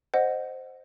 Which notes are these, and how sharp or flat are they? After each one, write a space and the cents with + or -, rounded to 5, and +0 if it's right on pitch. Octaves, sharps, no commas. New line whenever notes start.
C5 +0 D#5 -20 F#5 +0